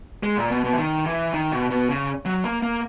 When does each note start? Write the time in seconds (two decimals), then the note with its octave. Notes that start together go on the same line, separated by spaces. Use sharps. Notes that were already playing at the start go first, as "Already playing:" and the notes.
0.23 G#3
0.37 A#2
0.51 B2
0.64 B2
0.73 E3
0.78 D#3
1.06 E3
1.34 D#3
1.52 B2
1.70 B2
1.89 C#3
2.25 F#3
2.44 A#3
2.62 A#3